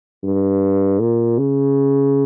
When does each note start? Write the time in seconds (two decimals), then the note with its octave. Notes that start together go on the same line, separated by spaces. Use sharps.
0.23 G2
1.00 A#2
1.39 C#3